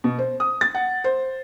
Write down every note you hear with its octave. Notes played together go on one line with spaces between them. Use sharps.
B2
C5
D#6
A6
F#5
C5